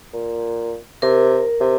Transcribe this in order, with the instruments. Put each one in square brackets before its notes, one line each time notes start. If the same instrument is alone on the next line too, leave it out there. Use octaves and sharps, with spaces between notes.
[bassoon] A#2
[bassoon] C3 [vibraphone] A#4
[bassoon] C3